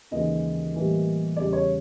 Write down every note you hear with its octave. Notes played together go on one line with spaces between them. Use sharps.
D#2 C#3 E3 G#3 D#5
A2 E3 G3 A#3
E2 C#3 E3 G3 D5
C#5